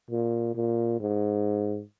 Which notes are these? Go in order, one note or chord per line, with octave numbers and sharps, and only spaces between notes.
A#2
A#2
G#2